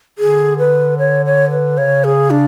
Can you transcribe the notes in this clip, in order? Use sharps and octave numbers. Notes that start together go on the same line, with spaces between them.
D3 G#4
B4
C#5
C#5
B4
C#3 C#5
G#4
D4